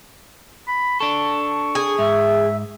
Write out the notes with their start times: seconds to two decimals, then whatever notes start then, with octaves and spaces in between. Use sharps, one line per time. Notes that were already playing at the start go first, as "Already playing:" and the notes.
0.68 B5
1.00 D4 A4 C#6
1.75 G#4
1.99 G#2 E5